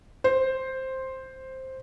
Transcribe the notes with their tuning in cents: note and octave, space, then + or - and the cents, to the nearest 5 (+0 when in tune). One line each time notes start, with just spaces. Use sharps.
C5 +5